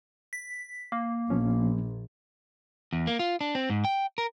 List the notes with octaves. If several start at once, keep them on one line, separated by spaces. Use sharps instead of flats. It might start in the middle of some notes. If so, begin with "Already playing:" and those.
B6
A#3
A#1 F3 B3 C#4
E2
A#3
F4
D4
C4
G#2
G5
A#4